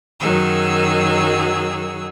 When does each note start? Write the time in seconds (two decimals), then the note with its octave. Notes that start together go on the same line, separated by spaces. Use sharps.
0.21 F#2 D#3 F#3 G#4 E6